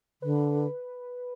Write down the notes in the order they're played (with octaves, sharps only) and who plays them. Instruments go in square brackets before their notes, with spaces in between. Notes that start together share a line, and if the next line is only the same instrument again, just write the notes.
[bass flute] D3 [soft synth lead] B4